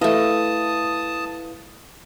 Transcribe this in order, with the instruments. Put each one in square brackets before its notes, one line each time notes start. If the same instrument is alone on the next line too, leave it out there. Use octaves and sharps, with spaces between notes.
[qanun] A3 D#5 [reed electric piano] E4 B4 F5 [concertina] A5 D#6